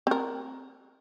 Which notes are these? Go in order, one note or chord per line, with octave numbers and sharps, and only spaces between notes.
C4 A#4